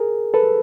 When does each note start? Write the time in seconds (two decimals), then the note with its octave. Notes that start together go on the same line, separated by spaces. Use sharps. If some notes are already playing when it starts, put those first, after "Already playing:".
Already playing: G#4 A#4
0.34 A4 B4